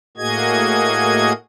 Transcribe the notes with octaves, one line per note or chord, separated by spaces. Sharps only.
A2 A#3 F#4 G#4 D#5 G#6